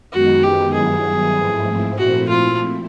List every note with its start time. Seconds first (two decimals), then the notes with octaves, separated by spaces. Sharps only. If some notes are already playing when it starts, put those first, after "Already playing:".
0.12 F#2 D#3 G#3 B3 D#4 F#4
0.43 G4
0.74 G2 D#3 F#3 B3 E4 G#4
1.36 G#2 F3 A3 C4 E4
1.98 A#2 F3 A3 C4 E4 F#4
2.29 F4